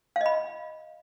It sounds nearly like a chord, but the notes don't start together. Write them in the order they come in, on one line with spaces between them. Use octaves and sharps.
F5 D#5 B5